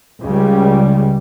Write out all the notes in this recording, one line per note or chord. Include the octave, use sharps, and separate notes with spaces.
C#2 C#3 G3